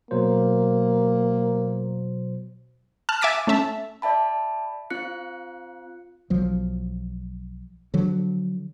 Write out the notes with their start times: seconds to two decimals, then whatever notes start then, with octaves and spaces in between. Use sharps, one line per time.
0.11 B2 F#3 A#3 C5
3.09 A5 F6 F#6
3.21 E5 G#5 D6 A6 B6
3.47 A3 C#4 E5 A5
4.02 D5 E5 A5 B5
4.90 C4 F4 F#6 C#7
6.30 B1 F3 F#3
7.94 D3 F3 F#3